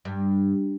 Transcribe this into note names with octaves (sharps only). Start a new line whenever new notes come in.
G2